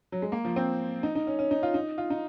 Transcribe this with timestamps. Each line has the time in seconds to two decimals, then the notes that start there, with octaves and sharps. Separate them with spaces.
0.12 F#3
0.22 G#3
0.32 A#3
0.45 F3
0.56 C4
1.03 D#4
1.15 D#4
1.27 C#4
1.39 C#4
1.51 D#4
1.63 F4
1.74 D#4
1.98 F4
2.10 D#4